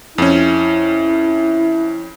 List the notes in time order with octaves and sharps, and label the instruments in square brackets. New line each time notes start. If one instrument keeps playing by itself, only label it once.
[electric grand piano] F2 C#4 [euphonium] E4